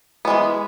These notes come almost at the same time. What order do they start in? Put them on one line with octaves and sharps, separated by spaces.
B3 G#3 E3